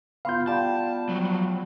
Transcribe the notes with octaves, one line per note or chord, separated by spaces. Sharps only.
B3 F4 F5 C6 G6
G3 G5 A5 G6
F3 F#3